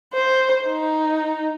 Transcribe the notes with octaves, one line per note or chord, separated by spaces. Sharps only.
C5
D#4